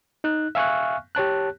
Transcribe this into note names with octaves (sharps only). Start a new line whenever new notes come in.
D#4 F#6
E5 F5 G#5 C#6 F6 F#6
G4 C#5 A5 F#6